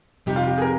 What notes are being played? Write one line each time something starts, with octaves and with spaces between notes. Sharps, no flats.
F2 C3 G3 C4 D#4 G4
F4
G4
G#4
A#4